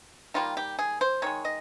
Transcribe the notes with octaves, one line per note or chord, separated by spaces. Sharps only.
D#3 G3 A#3 F4
G4
G#4
C5
D#3 G#3 C#5
D#5